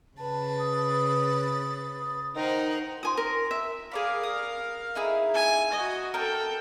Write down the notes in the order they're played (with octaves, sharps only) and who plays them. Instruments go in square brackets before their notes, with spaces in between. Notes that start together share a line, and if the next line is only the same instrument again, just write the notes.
[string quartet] C#3 B4 A6 [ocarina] A5
[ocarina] D#6
[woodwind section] D#3 D#4 [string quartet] A#4 C5 F#5
[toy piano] F4 C6 [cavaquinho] G#5 D#6
[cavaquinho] A#4 [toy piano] C6
[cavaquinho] E5
[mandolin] G#4 D5 B5 [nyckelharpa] A#4 F5
[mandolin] D#6
D#4 E4 G#4
[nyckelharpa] G#5
F#4 D#5
[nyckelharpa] A4 G5 [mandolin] A#4 A5 G6